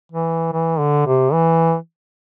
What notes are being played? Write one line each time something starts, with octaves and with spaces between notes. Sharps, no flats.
E3
E3
D3
C3
E3